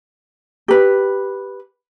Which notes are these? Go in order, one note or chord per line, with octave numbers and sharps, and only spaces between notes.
G4 B4